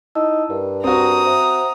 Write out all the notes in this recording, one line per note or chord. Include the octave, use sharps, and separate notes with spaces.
D#4 E4 A5 E6
G2 A#4
C4 F#4 A#5 D#6
C5 E5 F#5